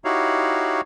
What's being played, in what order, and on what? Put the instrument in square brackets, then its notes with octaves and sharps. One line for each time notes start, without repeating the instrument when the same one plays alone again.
[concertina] D#4 E4 F#4 G4 C#5 F5